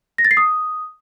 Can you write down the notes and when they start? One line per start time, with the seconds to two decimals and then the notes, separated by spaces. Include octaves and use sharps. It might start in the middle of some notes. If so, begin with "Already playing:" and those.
0.18 A#6
0.25 A6
0.31 C7
0.37 D#6